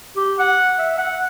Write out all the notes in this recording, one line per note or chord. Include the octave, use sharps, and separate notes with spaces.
G4
F#5
E5
F#5